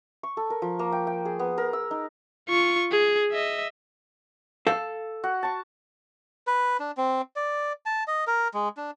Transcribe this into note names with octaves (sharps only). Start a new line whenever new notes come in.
C#6
A4
A#4
F3
A#3
G5
G5
G#4
B3
A#4
E6
D#4
F4 C#6
G#4
D#5 E5
A4 F5
F#4 F#5
A5 C#6
B4
D4
C4
D5
A5
D#5
A#4
G#3
D4